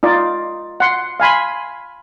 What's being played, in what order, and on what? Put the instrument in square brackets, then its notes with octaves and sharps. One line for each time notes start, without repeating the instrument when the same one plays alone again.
[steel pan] D#4 F4 D5 D#5
F#5 C6
F5 G#5 B5 C6